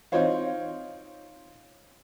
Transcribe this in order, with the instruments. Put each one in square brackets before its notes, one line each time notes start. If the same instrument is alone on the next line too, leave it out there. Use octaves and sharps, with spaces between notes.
[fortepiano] C4 D#4 F4 C5 C#5 F5